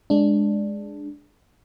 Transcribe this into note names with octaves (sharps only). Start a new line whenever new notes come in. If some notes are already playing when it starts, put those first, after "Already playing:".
G#3 D4